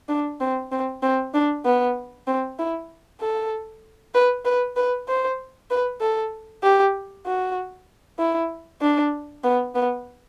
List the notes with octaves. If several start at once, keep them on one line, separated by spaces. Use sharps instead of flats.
D4
C4
C4
C4
D4
B3
C4
E4
A4
B4
B4
B4
C5
B4
A4
G4
F#4
E4
D4
B3
B3